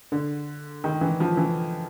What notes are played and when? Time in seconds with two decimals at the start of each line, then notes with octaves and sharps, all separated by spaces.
0.12 D3
0.84 D#3
1.01 E3
1.20 F3
1.37 E3